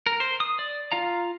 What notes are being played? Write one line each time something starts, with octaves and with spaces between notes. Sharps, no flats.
A#4
C5
D#6
D5
F4 F5 A#5